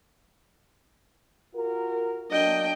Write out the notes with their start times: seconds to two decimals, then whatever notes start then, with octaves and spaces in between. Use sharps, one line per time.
1.55 F4 F#4 A#4
2.31 F#3 A#3 D4 D#5 G5